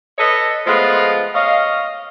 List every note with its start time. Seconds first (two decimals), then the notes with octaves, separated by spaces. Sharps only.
0.18 A4 B4 C#5 D#5
0.66 F3 G#3 A3 B3 F4
1.34 C#5 D#5 F5